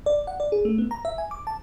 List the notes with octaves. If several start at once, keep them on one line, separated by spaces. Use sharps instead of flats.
D5
F#5
D5
G#4
A3
B3
A#5
E5
G#5
D6
A5